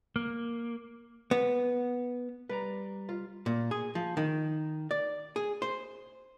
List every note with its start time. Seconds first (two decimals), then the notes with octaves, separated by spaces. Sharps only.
0.16 A#3
1.31 B3
2.49 G3 B4 D5 A#5
3.09 F4
3.46 A#2
3.71 G#4
3.95 F3
4.17 D#3
4.91 D5
5.36 G#4
5.62 C5